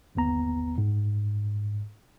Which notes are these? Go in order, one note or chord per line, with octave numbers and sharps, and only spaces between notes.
G1 D#2 B3 A#5
G#2